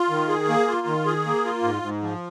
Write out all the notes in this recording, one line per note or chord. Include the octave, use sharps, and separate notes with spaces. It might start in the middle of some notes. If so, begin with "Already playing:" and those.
Already playing: F4
D#3
G#4
A#3
F4
D#3
G#4
A#3
F4
G#2
G#2
F3